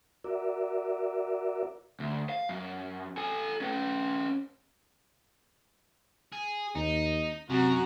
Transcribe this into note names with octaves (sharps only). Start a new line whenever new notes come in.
F#4 A#4 D5 E5
D2
F5
F#2
A4 G#5
C#4 B4
G#4
D#2 D#4
F#2 C3 F#4 A#5